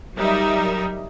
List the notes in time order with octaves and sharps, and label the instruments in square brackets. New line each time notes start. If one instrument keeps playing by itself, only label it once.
[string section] F#3 G3 D#4 A#4 E5